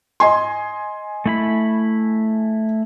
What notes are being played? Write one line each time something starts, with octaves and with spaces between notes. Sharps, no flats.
D#5 G#5 C6
A3 E4 B5